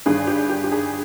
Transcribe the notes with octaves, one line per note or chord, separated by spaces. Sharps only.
G1 G2 D#3 G#4
G4
G4
G4
G#4